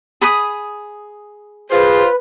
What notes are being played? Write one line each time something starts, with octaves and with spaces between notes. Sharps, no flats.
G#4 B5 D#6
F4 G#4 B4 C5